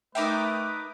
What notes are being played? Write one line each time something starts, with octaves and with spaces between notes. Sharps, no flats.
A3 D#4 A#4 B4 E5 G5 D6 D#6